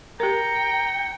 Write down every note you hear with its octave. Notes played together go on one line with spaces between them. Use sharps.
G4 A#4 G5 A#5 C#7